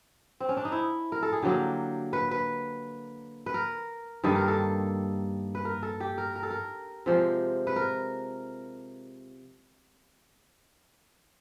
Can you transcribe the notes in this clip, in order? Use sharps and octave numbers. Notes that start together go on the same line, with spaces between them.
C4
C#4
D4
D#4
E4
A#4
A4
G#4
D3 F#3 A#3 G4
B4
B4
B4
A#4
G2 D#3 G3 A#3 A4
A#4
A4
B4
A#4
A4
G4
A#4
A#4
A4
A#4
C3 F3 G#3
B4
A#4